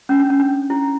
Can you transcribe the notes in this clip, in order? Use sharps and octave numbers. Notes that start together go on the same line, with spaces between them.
C#4
D4
C#4
D4
E4